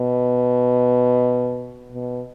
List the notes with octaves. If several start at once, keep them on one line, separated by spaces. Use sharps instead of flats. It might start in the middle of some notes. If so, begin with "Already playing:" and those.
Already playing: B2
B2